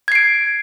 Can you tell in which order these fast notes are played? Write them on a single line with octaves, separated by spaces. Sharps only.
G#6 C7 D7